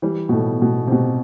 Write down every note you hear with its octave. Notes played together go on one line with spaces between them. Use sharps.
E3 G3
B2
A2
B2
C3
B2